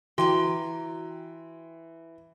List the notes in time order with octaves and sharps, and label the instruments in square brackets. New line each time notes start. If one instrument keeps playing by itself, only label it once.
[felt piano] E3 [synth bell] F#4 G5 [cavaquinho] A#5 C6